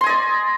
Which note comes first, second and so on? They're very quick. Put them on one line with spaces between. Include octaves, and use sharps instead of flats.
C6 G#5 D#5 D5